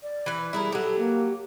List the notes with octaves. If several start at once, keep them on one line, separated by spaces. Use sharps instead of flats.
D5
E3 B4
G3 E4 G#4 A#4
F#3 G4 A4
A#3